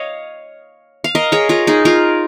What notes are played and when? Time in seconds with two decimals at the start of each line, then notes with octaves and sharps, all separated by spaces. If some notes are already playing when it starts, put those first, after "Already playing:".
Already playing: C#5 D#5 F5
1.04 F5
1.15 A#4 D#5
1.32 G#4 C#5
1.49 F4 A#4
1.67 D#4 G#4
1.85 F4 A#4